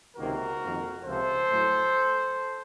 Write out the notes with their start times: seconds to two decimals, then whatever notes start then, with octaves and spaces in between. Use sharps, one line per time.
0.17 C#2 C3 D#3 A#3 F#4 A#4
0.61 F2 D#3 A#3
1.04 C#2 C3 F3 A4 C5
1.49 A2 F#3 A3